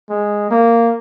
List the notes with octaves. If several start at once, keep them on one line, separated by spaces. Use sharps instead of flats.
G#3
A#3